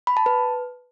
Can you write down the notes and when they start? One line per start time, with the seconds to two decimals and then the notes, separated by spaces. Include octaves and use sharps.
0.07 B5
0.17 A5
0.26 B4